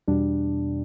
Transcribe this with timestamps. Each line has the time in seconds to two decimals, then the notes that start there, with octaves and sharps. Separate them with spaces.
0.08 E2 B2 G3 D4